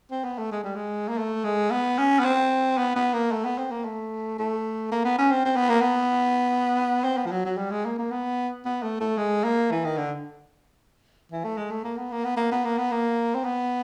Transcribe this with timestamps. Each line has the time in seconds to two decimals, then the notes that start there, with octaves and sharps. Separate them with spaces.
0.11 C4
0.24 B3
0.38 A3
0.52 G#3
0.64 G3
0.75 G#3
1.08 A#3
1.18 A3
1.45 G#3
1.71 B3
1.98 C#4
2.19 B3
2.25 C4
2.78 B3
2.96 B3
3.13 A#3
3.32 A3
3.44 B3
3.58 C4
3.71 A#3
3.85 A3
4.38 A3
4.91 A#3
5.05 B3
5.18 C#4
5.31 C4
5.45 C4
5.56 B3
5.69 A#3
5.81 B3
7.04 C4
7.17 B3
7.26 F3
7.32 F#3
7.45 F#3
7.57 G3
7.71 G#3
7.85 A#3
7.98 A#3
8.11 B3
8.65 B3
8.82 A3
9.01 A3
9.18 G#3
9.44 A#3
9.71 E3
9.85 D#3
9.97 D3
11.32 E3
11.44 A3
11.57 G#3
11.71 A3
11.84 A#3
11.97 B3
12.12 A#3
12.25 B3
12.37 A#3
12.51 B3
12.65 A#3
12.78 B3
12.91 A#3
13.35 C4
13.44 B3